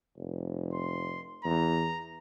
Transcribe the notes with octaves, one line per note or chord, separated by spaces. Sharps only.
F1
C6
E2 A#5